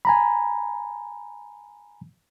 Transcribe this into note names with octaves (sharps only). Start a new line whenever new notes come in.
G#5 A#5 B5